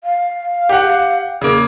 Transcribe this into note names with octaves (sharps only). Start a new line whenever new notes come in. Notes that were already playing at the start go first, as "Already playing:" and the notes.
F5
G4 F#5
C#3 A#3